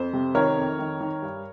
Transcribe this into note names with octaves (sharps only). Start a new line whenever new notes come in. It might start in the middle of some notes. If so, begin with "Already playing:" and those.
Already playing: F2 C5
C3
D#3 A#4 C#5
F2
D#3
D#3
G2